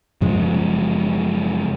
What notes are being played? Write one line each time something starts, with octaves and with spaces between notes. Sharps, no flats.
F#2 C#3 F3 G#3